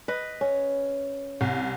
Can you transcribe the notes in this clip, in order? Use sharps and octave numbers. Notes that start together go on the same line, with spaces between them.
B4 D#5
C#4
C2